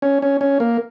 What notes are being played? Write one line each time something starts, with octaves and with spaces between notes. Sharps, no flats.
C#4
C#4
C#4
A#3